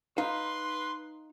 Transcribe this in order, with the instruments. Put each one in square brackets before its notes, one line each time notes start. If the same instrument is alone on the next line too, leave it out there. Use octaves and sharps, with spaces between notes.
[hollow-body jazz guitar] D#4 F5 [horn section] B4 C6